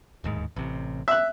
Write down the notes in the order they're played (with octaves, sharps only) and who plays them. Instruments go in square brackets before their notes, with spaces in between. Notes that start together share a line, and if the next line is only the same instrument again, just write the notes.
[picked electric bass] D1 D#2 G#2
A1 C3
[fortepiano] E5 F#6